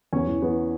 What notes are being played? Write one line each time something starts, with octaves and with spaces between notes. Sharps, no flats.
E2 C#4
E3
E3 B3